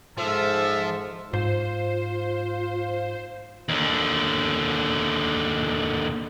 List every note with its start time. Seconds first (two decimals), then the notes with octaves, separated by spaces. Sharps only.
0.18 G#2 F3 A4 E5
1.33 G#2 F4 C5
3.69 D#2 D3